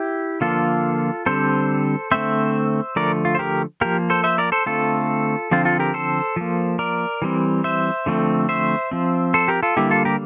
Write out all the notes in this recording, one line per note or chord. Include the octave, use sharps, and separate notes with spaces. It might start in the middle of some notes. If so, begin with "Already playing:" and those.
Already playing: E4 G4
D3 F3 A#3 F4 A4
D3 G3 C4 A4 C5
D3 A3 C4 C5 E5
D3 F3 A3 A#4 D5
F4
C5
G4 A#4
F3 A#3 G4 A#4
A4 C5
C5 E5
A#4 D5
A4 C5
D3 A3 C4 F4 A4
D3 F3 C4 F4
F4 A4
G4 A#4
A4 C5
F3 A#3
A#4 D5
E3 G3 C4
C5 E5
D3 F3 A3 C4
C5 E5
F3 C4
A4 C5
G4 A#4
F4 A4
D3 G3 A#3 E4 G4
F4 A4
G4 A#4